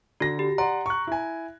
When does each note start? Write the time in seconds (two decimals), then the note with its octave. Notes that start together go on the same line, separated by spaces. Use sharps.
0.20 D3 F#4 A#6
0.39 G4
0.58 D5 F#5 A#5 C6
0.86 C#6 F#6
1.07 E4 G#5